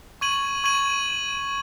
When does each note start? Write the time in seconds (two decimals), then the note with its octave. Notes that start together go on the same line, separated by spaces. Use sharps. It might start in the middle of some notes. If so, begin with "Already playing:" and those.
0.21 C#6 G#6 D#7 F#7
0.64 C#6 G#6 D#7 F#7